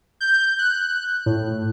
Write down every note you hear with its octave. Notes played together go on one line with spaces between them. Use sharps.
G6
F#6
A2